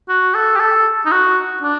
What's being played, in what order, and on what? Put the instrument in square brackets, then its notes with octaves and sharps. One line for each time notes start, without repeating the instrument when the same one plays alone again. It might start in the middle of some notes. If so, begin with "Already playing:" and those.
[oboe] F#4
A4
G4
A4
D#4
F#4
D4